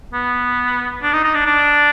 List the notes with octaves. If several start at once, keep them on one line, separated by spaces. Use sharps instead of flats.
B3
D4
D#4
D#4
D4
D4